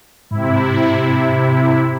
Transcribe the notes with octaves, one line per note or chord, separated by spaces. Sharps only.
G#2 C3 E4